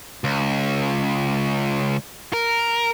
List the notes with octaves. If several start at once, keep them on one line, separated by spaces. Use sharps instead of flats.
C#2
A#4